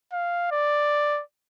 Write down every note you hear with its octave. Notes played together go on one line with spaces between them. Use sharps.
F5
D5